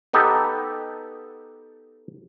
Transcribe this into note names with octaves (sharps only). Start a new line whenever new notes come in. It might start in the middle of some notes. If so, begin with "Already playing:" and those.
B3 D#4 G4 A4